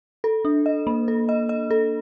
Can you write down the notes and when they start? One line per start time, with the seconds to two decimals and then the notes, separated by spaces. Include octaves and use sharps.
0.24 A4
0.45 D4
0.66 D#5
0.87 A#3
1.08 A4
1.29 D#5
1.49 D#5
1.71 A4